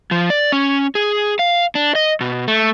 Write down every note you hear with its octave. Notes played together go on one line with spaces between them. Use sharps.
F3
D5
C#4
G#4
F5
D4
D#5
B2
A3